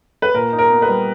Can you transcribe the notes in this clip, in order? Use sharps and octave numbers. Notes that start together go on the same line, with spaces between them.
B4
A#2 A#4
D#4
A#4
B3
B4
G3